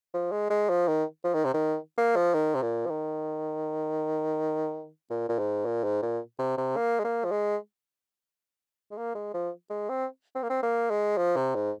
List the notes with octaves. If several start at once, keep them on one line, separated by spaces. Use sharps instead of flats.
F3
G#3
G#3
F3
D#3
F3
D#3
C3
D#3
A#3
F3
D#3
C3
A#2
F3
D#3
A#2
A#2
G#2
A#2
G#2
A#2
C3
C3
A#3
G#3
A#3
F3
G#3
G#3
A#3
G#3
F3
G#3
C4
C4
A#3
C4
A#3
G#3
F3
C3
G#2